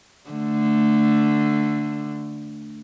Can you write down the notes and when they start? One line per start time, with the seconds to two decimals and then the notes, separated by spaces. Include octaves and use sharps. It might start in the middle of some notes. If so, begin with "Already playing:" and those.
0.30 D3 A3